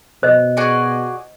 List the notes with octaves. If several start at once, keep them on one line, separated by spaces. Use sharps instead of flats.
B2 C5 D#5
F#4 G#4 D5